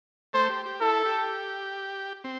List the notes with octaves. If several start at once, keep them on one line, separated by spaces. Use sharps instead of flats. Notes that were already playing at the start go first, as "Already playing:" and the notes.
A3 A4 C5
G4
G4
E4 A4
G4
C4